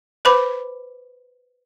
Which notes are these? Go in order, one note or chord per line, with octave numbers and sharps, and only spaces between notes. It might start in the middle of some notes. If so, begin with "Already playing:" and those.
B4 C5 B5 D6